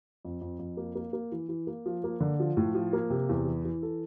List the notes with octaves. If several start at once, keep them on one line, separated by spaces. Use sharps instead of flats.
F2
F2
F2
A#3
A#3
A#3
E3
E3
A#3
F3
A#3
D3
F3
A2
F3
A#3
C3
E2
E3
E3
A4